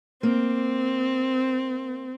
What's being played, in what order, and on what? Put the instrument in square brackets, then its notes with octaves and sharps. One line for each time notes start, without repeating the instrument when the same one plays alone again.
[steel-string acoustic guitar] A#3 [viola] C4